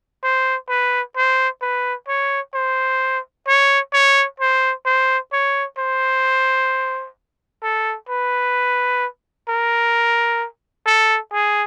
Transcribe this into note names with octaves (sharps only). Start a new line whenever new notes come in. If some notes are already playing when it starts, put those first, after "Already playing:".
C5
B4
C5
B4
C#5
C5
C#5
C#5
C5
C5
C#5
C5
A4
B4
A#4
A4
G#4